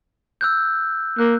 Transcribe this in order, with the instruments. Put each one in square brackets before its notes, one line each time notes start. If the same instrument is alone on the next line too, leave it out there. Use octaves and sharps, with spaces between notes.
[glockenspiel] E6 F#6 G6
[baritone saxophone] A#3 [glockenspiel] F#6